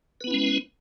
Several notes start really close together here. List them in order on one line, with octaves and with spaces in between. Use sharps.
B4 B3 E4 C#4 G#3